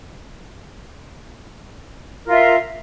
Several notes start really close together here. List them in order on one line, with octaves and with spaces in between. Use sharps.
A#4 F4 E5